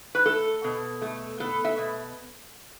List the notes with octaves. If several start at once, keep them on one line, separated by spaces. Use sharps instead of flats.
B4
A3 A4
B2
A3
B3 A4
E5
B2